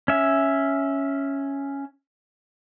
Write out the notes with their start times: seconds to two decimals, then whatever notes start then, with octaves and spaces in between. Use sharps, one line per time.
0.08 C#4 E5